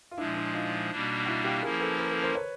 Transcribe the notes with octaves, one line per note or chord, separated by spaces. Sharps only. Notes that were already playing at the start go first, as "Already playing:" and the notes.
F4
A#2 F3 G#3 D4 E4
D4 E4
D#4 F4
B2 G3 A#3 D4
E4 F#4
F4 G4
F3 A#3 C#4 E4 G#4 A#4
A4 B4
A#4 C5
A4 B4
A#4 C5
B4 C#5